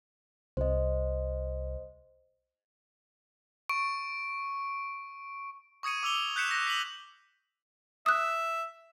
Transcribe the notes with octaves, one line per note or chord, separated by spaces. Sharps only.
C2 C5 D#5
C#6 D7
C#6 D#6 G#6 C#7 D#7
D6 E6 F7 G7
F#6 G6 B6 C#7 E7
F#6 A#6
B6 D#7 E7 F#7
E5 D#6 F#6